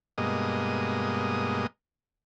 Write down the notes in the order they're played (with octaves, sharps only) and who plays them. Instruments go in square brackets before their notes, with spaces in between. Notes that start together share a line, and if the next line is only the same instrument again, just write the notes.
[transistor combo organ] G2 B2 G#3 A#3 D#5